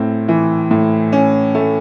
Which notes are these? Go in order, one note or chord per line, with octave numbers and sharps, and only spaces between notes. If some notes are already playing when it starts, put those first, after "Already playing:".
Already playing: A2 C4
E3
A2
C#4
A3